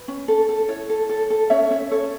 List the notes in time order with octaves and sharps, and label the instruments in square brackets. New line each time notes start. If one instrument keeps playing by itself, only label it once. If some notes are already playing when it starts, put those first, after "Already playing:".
Already playing: [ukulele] B4
C#4
A4
A4
E4 C#5
A4
A4
A4
C#4 C#5 E5
C#4 C#5 E5
A4 C#5